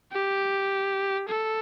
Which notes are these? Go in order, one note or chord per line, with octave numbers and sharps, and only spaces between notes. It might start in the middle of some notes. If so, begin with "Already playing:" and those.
G4
A4